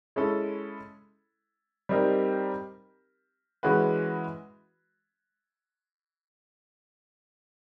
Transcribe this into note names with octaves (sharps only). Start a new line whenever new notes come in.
G#3 C#4 E4 A4
G3 C4 D#4 G4 A#4
E3 G#3 C#4 F#4 B4